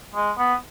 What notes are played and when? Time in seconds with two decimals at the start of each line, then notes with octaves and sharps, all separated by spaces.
0.15 G#3
0.38 B3